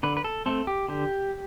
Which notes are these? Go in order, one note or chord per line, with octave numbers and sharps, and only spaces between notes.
D3 B4
B4
A4
A3 C4 A4
G4
D3 G4